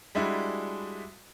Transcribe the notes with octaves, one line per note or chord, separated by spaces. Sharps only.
G3 G#3 D4 E4 F#4